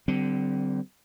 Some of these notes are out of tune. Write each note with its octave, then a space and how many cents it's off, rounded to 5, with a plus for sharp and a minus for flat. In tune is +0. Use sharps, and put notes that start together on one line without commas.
D3 +0 G3 -35 C4 -25